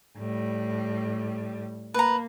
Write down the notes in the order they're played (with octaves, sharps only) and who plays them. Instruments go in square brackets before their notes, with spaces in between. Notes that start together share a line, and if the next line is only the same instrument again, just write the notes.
[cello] A2 G3
[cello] A#3 [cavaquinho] B4 A#5